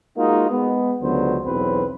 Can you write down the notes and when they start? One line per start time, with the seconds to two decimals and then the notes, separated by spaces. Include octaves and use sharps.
0.17 G#3 A#3 D#4 F4 F#4
0.50 G#3 B3
1.01 C#2 D3 F#3 B3 C5
1.45 B1 E2 F#3 C4 B4